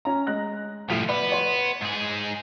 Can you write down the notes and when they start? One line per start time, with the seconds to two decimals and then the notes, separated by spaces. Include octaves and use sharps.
0.05 C#4 A#5
0.27 G#3 F#6 A#6
0.89 C2 A2 F3 B6 F7
1.09 B3 D5 B5
1.32 C#5 C6
1.81 G#2 G#4